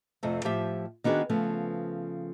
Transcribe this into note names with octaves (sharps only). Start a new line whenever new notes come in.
F2 C3 F3 A3
A2 F3 G4 E5
D#3 B3 D4 F#4 G#4
C#3 F3 A3 B3